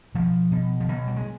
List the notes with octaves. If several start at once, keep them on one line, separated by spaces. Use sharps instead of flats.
B2 F3
B2
F3
B2 F#3
G3
G#3